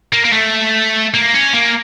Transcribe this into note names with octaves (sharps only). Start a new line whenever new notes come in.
A#3
A#3
A3
A#3
C#4
A#3